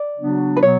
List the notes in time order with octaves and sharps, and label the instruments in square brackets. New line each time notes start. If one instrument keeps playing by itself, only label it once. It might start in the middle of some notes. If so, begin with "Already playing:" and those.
Already playing: [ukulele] D5
[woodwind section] C#3 F#3 B3 D4 F#4
[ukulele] B4
[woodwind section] B2 F#3 B3 [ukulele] C#5